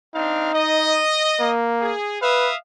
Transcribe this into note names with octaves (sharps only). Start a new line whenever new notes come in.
C4 D4 D#4 F5
D#5
A#3
G#4
B4 E5 F5 D#6